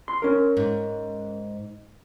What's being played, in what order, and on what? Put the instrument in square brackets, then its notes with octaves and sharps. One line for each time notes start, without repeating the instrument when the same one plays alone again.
[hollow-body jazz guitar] C6
C#4 A#4
[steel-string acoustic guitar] G#2